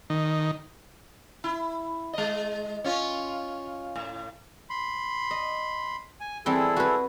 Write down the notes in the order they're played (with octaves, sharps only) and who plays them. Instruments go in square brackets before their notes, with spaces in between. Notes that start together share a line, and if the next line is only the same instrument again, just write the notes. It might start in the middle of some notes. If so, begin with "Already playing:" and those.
[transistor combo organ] D#3
[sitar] E4
G#3 D#5
C#4 F4 C#5
A2
[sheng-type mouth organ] B5 C6
[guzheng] D#5
[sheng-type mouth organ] G#5
[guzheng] E3 G3 C4 [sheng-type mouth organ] E4 G#4 A4
[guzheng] F#4 B4